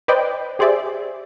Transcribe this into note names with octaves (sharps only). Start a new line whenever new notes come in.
B4 C5 D5 D#5 G5
G4 G#4 C5 D5 E5